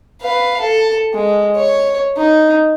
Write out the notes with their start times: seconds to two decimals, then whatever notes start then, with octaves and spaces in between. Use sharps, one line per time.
0.22 B4 F5
0.60 A4
1.14 G#3
1.56 C#5
2.16 D#4